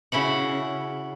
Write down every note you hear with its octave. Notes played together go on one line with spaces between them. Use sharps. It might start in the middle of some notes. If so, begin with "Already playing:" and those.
C#3 E4 F#4 F#5